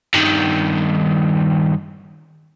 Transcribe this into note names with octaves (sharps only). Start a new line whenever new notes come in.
G2 D#3